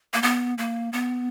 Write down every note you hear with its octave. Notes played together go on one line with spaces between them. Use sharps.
A#3
B3
A#3
B3